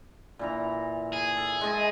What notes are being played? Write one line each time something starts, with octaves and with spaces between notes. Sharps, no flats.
A#2 E3 A#5
G#4
A4
G#3 D#5 A5